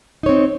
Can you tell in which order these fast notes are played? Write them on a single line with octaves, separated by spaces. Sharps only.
D#4 C#5 C4